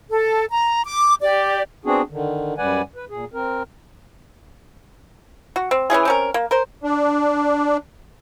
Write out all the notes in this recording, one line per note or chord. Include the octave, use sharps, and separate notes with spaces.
A4
A#5
D6
G4 D5
B3 C4 D4 F#4 G#4
D3 D#3
F#2 G3 B4 D5 F#5 G#5
B4
A#2 G#4
C4 A#4
F#4
C4
E3 C#4 F4 G#4
C4 C#4 A#4
A#3
A#4 C5
D4